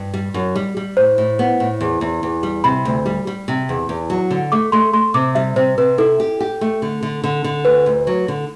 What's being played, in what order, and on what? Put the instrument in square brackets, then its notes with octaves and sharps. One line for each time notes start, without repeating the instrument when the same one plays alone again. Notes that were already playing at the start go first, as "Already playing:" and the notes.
Already playing: [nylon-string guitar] G2
G3
F#2
G3
G3
[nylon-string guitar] A2 [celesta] C5
[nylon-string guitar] A2
B3
A2
E2
E2
E2
G3
[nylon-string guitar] C3 [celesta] B5
[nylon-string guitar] D2
G3
G3
C3
E2
E2
F#3
D3
[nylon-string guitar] A3 [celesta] D6
[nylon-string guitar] A3 [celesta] C6
[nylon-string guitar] A3 [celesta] C6
[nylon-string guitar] C3 [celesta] D6
[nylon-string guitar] G3 [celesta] E5
[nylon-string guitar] C3 [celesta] C5
[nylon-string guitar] C3 [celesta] B4
[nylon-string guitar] E4 [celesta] A4
[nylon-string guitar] G4
G4
A3
D3
D3
D3
D3
[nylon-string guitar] D2 [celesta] B4
[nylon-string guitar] D2
F#3
D3